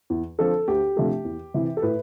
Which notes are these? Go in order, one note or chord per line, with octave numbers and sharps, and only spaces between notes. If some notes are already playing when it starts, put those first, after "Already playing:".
E2
D3 F3 C4 A4
D2 G4
C3 F3 A3 D4
E2
C3 E3
A4
A2 B4